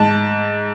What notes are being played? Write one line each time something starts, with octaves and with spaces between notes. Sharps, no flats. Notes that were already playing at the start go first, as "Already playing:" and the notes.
Already playing: G#2 A5